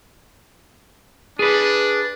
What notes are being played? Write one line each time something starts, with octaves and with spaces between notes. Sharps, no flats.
D4 G#4 B4